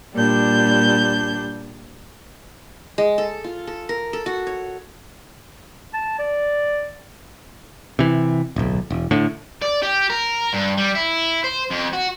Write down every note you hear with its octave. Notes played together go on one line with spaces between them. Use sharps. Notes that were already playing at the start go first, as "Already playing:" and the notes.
A#2 G3 D4 G6
G#3
A4
F4
A4
A#4
A4
F#4
C#5
A5
D5
C3 E3
D1 B1
E1
A2 D3
D5
G4
A#4
G2
G3
E4
C5
F2
F#4